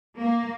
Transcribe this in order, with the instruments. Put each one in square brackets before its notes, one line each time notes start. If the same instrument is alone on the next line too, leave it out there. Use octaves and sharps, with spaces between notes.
[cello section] A#3